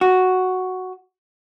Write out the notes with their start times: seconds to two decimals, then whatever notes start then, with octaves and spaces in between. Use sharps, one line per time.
0.01 F#4